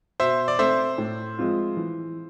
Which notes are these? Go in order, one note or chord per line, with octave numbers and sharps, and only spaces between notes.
B2 C5 E5
D5
A3 C4 C5 E5
A2
F3 G#3 C4 F4
E3